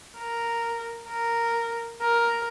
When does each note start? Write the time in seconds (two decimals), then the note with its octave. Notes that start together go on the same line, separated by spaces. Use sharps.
0.19 A#4
1.10 A#4
2.02 A#4